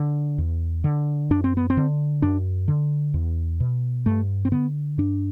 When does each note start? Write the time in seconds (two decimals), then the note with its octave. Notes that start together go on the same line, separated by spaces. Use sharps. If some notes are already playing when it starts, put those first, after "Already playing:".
Already playing: D3
0.38 E2
0.84 D3
1.30 F#2 D4
1.44 C4
1.57 B3
1.70 C4
1.77 D3
2.22 F#2 D4
2.68 D3
3.14 E2
3.60 B2
4.06 G2 A3
4.45 C4
4.52 D3 B3
4.98 G2 D4